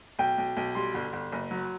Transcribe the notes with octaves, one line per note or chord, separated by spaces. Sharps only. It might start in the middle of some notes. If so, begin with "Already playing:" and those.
B1 G5
B1
B1
G3 C6
G1
G1
F#1
F#3